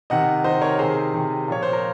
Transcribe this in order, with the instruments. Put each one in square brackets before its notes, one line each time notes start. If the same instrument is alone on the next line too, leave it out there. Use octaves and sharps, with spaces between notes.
[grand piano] C3 D#3 D#5 F#5
C3 D#3 C5 D#5
A#4 C#5
C3 D#3 G#4 C5
C3 D#3
A#2 F3 C#5
C5
A#4